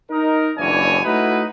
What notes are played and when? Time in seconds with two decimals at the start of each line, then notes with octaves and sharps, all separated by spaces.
0.10 D#4 A#4
0.58 F#1 D#2 E3 D4 C#5 G#5
1.05 A3 D#4 E4 F#4 B4